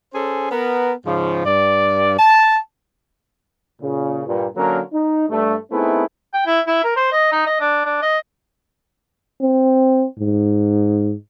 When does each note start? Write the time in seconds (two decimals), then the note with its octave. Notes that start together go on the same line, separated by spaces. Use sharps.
0.14 C#4 G#4 A4 C5
0.52 B3 A#4
1.05 G#2 C#3 F3
1.46 G2 D5
2.19 A5
3.82 A#2 C#3
4.27 G2 A#2
4.56 D3 F#3 A#3 C#4 A#4
4.92 D#4
5.30 G2 A3
5.71 A3 B3 C4 D#4 E4 G#4
6.34 G5
6.46 E4
6.67 E4
6.84 A#4
6.96 C5
7.12 D#5
7.32 D#4
7.47 D#5
7.60 D4
7.85 D4
8.02 D#5
9.41 C4
10.19 G#2